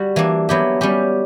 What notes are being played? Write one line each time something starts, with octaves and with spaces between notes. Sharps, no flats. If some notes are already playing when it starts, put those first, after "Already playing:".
Already playing: G3 F#4
E3 A#3 D4
F#3 B3 E4 G4
G3 C#4 G4